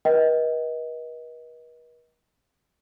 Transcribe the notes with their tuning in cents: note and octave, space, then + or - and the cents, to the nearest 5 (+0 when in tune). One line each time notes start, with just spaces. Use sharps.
B4 -45 D#5 +25 G5 -30